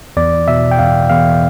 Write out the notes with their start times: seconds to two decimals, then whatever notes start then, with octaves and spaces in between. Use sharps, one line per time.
0.17 E2 D5
0.48 B2 E5
0.71 G5
0.79 E2 F5
1.09 E2 F5